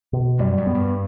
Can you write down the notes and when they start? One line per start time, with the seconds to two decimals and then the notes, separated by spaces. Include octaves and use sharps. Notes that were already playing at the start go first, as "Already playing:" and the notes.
0.13 B2
0.39 F#2 G3
0.58 F#2
0.67 B3
0.75 G2